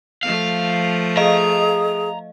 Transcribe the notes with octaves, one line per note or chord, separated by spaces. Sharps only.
F3 A3 F5
G#4 D#5 F5 A#5